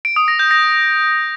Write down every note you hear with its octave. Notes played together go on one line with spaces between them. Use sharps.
D7
D#6
A#6
G6
A#6